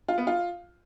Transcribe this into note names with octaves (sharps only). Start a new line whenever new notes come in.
F4
B3
F4